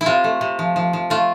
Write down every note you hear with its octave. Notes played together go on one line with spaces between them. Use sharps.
E4
C3 F4
A3
C3
F3
F3
F3
A3 F4